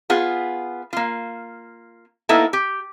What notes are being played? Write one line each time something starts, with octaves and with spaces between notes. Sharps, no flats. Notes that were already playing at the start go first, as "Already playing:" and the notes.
B3 F4 G#4 F#5
A#3 F4
A#3 B3 D#4 E4 A4
G4